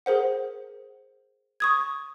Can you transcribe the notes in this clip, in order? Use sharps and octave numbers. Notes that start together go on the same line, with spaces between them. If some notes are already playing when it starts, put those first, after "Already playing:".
G#4 A#4 C5 F#5
C#6 D#6 G#6